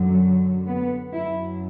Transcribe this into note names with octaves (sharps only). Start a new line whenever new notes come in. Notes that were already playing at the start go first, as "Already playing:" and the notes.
Already playing: F#2 D3 F#3
B3
F#2 F#3 E4